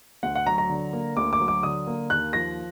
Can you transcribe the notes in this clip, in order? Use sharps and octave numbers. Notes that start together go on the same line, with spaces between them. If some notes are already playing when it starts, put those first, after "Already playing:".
D2 F#5
F#5
F#3 A#5
A#5
D3
A#3
D2 D6
D6
F#3
D6
D3 D#6
A#3
D#2 F#6
F3 A#6